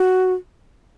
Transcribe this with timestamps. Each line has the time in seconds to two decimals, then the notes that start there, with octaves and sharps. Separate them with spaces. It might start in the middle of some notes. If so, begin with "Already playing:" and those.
Already playing: F#4